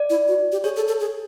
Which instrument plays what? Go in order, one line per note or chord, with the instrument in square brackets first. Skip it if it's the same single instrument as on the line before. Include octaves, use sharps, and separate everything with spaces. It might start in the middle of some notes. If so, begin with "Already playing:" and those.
Already playing: [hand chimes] D5
[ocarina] E4
F#4
G4
[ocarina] G#4 [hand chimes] C#5
[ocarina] A4
A4
G#4